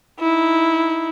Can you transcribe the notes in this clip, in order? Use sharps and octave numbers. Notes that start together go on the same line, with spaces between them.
D#4 E4